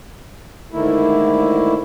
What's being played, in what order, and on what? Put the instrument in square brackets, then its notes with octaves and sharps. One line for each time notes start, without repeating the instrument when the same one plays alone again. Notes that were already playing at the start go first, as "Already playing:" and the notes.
[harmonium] G#2 D3 D#3 A3 A#3 E4